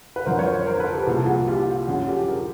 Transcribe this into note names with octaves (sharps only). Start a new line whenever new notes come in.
B4
F2 D3 F#3 A#4 C5
C#5
A#4 C5
A#4 C5
A4 B4
G4 A4
C2 A#2 F3 A#3 G#4
A4
F#4 G#4
F4 G4
F#2 D3 F3 F#4 G#4
G4 A4
G#4 A#4